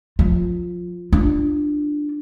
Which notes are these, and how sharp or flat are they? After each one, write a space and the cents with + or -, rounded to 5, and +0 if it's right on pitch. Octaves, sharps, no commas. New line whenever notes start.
F3 +25 F4 +0
D4 +10 F4 -15